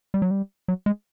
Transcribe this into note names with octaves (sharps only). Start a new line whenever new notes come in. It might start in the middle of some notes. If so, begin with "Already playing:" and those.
G3
F#3
G3
F#3
G#3